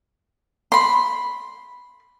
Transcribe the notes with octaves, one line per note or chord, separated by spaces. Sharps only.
B5 C6